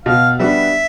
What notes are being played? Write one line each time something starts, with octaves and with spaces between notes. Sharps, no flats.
B2 F5
G3 B3 D4 F#4 E5